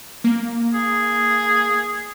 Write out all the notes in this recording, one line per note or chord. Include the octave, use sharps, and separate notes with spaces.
A#3
G#4